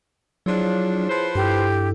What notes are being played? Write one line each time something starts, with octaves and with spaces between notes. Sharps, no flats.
F3 F#3 D4 E4 G#4 C#5
F3 B4 C5
G2 E4 G4 A4